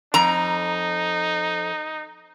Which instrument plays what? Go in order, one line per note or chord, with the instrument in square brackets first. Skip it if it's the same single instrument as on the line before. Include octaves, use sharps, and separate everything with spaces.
[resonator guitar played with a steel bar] F2 A#5 [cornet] D#4